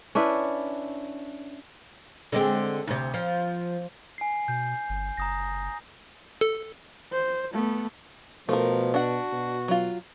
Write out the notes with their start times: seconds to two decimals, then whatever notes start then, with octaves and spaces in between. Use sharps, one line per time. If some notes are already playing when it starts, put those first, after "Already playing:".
0.15 C#4 D4 E4 B4
2.32 D3 G#3 C4
2.87 D2 C3
3.14 F3
4.18 G#5 C7
4.48 B2 G6
4.89 G1
5.17 F#1 A#5 D#6 A#6
6.41 A4
7.12 C5
7.53 A3 B3
8.49 B2 F3 A3 A#4
8.94 D4 F#4 F#5
9.33 B2
9.68 F#3 F4